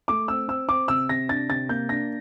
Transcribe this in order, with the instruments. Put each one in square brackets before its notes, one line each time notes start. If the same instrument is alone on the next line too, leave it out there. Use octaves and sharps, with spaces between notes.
[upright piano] A3 [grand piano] D6
[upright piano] C4 [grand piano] E6
[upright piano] C4 [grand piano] E6
[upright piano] C4 [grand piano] D6
[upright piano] C3 [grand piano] E6
[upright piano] C3 [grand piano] A#6
[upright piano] D4 [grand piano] A6
[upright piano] C3 [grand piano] A6
[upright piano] A#3 [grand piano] G6
[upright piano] D4 [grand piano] A#6